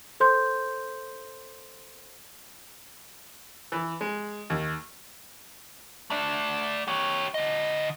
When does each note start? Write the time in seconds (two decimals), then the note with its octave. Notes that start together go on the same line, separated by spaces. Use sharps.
0.20 A4 C5 C6 G6
3.72 E3
4.01 G#3
4.50 D#2
6.10 A3 D5
6.88 G4 C#5
7.34 D3 D#5